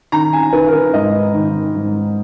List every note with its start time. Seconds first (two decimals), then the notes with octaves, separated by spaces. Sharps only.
0.12 D#3 A#5
0.33 G#5
0.53 D#3 B4
0.68 A#4
0.73 B4
0.94 G#2 D#5
1.34 D#3
1.75 G#2